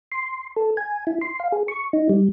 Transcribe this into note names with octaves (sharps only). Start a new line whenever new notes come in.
C6
A4
G#5
E4
C6
F5
G#4
C#6
D#4
G3